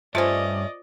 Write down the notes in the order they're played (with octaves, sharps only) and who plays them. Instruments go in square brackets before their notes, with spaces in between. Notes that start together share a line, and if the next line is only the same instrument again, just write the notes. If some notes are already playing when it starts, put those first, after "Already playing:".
[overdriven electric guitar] G2 [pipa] A3 C#4 [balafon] F4 C5 [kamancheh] D5 D#5